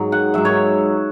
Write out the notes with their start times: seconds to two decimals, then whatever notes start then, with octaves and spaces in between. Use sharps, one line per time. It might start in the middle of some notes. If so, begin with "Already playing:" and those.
Already playing: G#2 F#3
0.12 F#5
0.34 G#2 F#3 E5
0.45 C#5